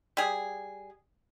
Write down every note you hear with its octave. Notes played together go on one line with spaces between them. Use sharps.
G3 G#4